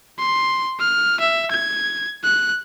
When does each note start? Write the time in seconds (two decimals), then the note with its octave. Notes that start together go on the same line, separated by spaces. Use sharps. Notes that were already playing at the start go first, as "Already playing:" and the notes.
0.19 C6
0.79 F6
1.20 E5
1.51 G#6
2.24 F#6